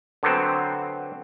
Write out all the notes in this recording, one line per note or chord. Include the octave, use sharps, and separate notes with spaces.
D3 F#3 B3 C4